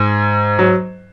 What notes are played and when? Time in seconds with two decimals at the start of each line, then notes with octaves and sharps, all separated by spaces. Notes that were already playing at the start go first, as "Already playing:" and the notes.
Already playing: G#2
0.59 F#3